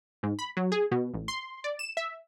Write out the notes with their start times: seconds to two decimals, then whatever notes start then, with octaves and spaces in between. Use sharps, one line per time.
0.23 G#2
0.39 B5
0.57 F#3
0.72 G#4
0.91 B2
1.14 A1
1.28 C6
1.64 D5
1.79 E7
1.97 E5